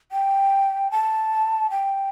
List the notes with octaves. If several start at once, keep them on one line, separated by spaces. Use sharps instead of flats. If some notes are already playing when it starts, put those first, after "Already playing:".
G5
A5
G5